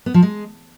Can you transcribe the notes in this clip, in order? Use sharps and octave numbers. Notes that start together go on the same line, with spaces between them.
B3
F3
G#3